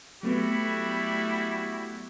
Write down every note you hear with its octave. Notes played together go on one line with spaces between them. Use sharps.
F#3 G3 A3 B3 E4 F#4